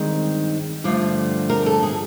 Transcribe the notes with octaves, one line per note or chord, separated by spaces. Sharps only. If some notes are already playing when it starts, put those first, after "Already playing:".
Already playing: G2 D#3 G#3 C4
G2 D3 F3 A3
A#4
A4
G#4